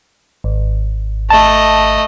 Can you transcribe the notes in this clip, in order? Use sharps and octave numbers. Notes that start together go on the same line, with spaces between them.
G#1
A3 D#5 A5